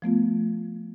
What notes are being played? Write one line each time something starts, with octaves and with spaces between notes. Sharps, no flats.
F3 A3 B3 F4